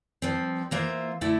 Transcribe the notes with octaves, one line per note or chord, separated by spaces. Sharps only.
G2 F3 C4
E3 A#3 F4 C5 E5
D3 A3 E4